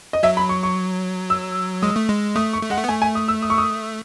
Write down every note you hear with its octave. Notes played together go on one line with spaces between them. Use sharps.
D#5
F#3 E5
B5
C#6
C#6
E6
G#3 D#6
A3
G#3
A3 D#6
C#6
A3
G#3 F#5
A3
B3
A3 G#5
G#5
D#6
E6
D#6
C#6
D#6